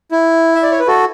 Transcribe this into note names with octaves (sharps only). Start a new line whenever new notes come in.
E4
E5
D5
C#5
B4
F#4 A4